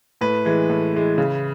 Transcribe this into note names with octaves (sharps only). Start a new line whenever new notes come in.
A2 B4
E3 G#3
A2
E3 G#3
C#3